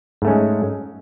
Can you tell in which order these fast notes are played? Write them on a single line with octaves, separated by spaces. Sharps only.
G#2 A3 C#4 G#3